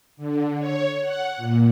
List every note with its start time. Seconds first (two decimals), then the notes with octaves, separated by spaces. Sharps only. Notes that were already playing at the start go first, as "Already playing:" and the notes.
0.17 D3
0.59 C#5
1.01 F#5
1.37 A#2